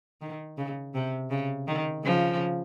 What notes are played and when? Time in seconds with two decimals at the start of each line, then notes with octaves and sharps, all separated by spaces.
0.21 D#3
0.58 C#3
0.94 C3
1.30 C#3
1.67 D#3
2.04 C#3 F3